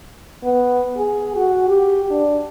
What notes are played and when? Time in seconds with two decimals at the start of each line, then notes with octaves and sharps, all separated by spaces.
0.43 B3
0.98 G#4
1.36 F#4
1.68 G4
2.10 D4